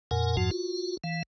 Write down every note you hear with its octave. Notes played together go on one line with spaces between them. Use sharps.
F2 A#2 A#4 F#5 G#5
F2 G#2 F3 F#4 F#5 A5
F4 F#4
E3 F5